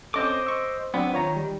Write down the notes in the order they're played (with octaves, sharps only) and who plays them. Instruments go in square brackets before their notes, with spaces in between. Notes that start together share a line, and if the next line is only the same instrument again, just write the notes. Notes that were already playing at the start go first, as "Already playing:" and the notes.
[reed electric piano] C4 C#4 A4 [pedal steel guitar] C5 D#5 D6
[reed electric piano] C6 C#6 E6
[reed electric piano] F#3 C4 D4 [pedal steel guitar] B3
[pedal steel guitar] D#3 [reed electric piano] F4 C#5 A#5
[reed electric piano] G3